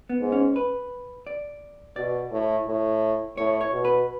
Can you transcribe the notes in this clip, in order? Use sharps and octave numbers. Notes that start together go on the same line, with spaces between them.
B3
G#2
C#4
B4
D5
B2 D5
A2
A2
A2 C#5
C#5
B2
B4